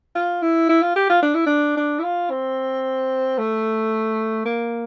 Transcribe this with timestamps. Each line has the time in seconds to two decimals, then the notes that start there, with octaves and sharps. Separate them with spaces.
0.15 F4
0.42 E4
0.69 E4
0.82 F4
0.96 G4
1.10 F4
1.23 D4
1.35 E4
1.46 D4
1.77 D4
1.99 E4
2.04 F4
2.30 C4
3.39 A3
4.46 A#3